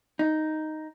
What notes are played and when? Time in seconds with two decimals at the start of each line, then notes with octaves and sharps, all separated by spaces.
0.19 D#4